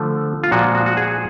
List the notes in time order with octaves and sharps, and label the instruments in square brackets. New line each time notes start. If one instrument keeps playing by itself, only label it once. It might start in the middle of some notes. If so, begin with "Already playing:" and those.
Already playing: [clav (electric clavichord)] D3 F3 A3
F4
A#2 F3 G#3 F#4
F#4
F#4
G#4